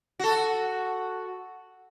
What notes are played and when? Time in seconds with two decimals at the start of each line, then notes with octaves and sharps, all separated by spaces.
0.19 F#4 A4